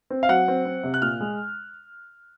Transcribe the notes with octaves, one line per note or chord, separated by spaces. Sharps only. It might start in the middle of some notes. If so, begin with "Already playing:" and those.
C4
F5
F#3 F#5
C4
C4
C3
F#6
A#2 F6
G#3